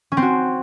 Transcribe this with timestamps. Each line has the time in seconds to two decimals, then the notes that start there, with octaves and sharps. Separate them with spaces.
0.12 C#4
0.17 C4
0.22 F#4